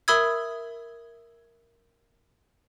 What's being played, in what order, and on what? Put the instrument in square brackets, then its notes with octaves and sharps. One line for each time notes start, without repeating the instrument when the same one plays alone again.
[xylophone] A#4 E5 B5 D#6 E6 G#6